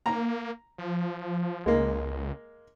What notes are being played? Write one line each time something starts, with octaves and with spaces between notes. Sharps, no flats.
A#3 A#5
F3
C#2 G#3 A#3